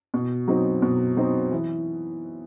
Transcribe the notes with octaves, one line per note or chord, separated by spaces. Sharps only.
B2
F#3 C4 D#4
B2
F#3 C4 D#4
E3